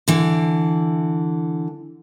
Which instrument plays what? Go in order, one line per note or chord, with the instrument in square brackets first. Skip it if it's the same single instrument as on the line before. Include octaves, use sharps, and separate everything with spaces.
[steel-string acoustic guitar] D3 E3